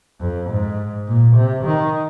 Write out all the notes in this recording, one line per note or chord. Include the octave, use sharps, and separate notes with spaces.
F2
G#2
A#2
C3
D#3